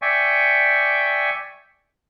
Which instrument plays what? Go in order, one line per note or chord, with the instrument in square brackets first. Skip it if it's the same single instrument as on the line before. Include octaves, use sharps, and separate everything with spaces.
[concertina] D5 E5 G5 G#5 C#6